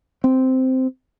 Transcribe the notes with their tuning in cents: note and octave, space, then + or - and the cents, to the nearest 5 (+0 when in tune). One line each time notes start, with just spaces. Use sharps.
C4 -10